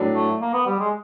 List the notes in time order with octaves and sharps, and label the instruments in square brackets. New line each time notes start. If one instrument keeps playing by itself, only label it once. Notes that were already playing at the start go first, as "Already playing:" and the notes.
Already playing: [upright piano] A2 F#3 D4
[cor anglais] A3
A#3
B3
G3
G#3